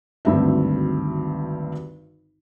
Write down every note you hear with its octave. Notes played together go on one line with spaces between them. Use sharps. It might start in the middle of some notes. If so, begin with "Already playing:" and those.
G#1 D2 G2 C4 E5